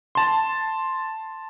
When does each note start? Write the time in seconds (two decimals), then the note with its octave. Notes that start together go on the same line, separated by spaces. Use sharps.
0.15 A5 C6